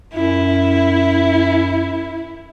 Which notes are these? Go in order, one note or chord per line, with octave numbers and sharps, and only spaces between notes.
F#2 E4